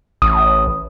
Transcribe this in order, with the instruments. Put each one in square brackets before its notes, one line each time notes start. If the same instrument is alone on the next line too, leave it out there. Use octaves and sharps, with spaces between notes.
[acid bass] A1 [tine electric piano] D#6